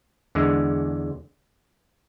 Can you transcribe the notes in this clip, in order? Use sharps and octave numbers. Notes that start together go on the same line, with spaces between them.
E2 D3 G#3